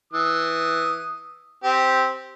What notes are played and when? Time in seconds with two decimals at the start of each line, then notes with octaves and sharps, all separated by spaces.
0.13 E3 D#6
1.64 C4 G4